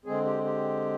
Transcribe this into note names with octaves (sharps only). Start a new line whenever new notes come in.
D3 G#3 C4 G#4
G4
G4